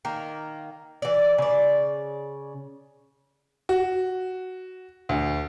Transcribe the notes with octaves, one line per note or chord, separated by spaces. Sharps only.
D#3 A#3
E3 D5
C#3 D5
F#4
D2